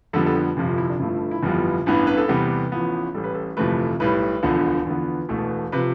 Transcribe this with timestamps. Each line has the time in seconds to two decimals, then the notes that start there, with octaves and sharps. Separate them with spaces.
0.13 F2 D3 G3 B3 A4
0.26 A4
0.35 G4
0.57 G1 F2 C3 F4
0.68 F4
0.78 E4
0.89 D4
1.00 G1 G2 F3 A3 E4
1.31 E4
1.43 G1 F2 E3 G3 B3 F4
1.86 A1 G2 E3 B3
2.07 B4
2.17 A4
2.28 E2 C3 G3 B3 G4
2.72 A1 A2 F3 B3
3.14 A1 A2 G3 A4
3.24 B4
3.34 A4
3.57 G1 F2 C3 E3 A3 B4
4.00 B1 A2 G3 B4
4.43 E1 D2 D3 F3 B3
4.86 E2 D3 F3 B3
5.29 E1 E2 B2 A3
5.72 C3 F3 B4